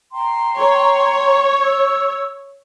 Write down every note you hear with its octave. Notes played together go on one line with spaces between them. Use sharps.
G5 A#5 C6
C#5
E6